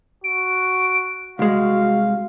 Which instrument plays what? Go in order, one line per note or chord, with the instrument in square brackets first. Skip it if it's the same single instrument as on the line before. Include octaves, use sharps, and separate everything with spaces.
[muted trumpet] F#4 [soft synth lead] D7
[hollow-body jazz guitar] C2 G#3 [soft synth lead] F#4 [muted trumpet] F5